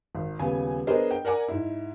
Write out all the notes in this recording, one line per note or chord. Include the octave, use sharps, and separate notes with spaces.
G#1
D#1 C#3 B3 G#5
B3 D4 G#4 A#4 C5 D#5
G5
A#4 D5 F#5 G#5 D6
G#2 E4